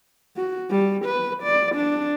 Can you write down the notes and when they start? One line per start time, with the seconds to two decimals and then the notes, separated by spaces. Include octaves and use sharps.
0.37 F#4
0.70 G3
1.05 B4
1.43 D5
1.75 D4